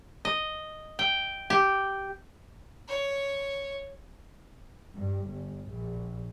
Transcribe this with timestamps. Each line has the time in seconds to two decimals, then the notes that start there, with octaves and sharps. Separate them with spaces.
0.25 D#5
0.99 G5
1.50 G4
2.88 C#5
4.94 G2
5.28 G1
5.70 A#1